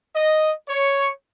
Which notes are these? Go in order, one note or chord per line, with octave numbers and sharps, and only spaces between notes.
D#5
C#5